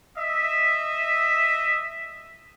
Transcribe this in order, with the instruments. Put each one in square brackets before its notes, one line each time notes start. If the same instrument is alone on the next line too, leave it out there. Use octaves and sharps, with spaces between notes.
[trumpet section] D#5 E5